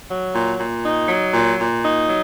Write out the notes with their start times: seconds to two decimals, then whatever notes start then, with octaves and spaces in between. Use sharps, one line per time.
0.08 F#3
0.34 A#2
0.58 A#2
0.83 D#4
1.08 F#3
1.33 A#2
1.58 A#2
1.83 D#4
2.07 F#3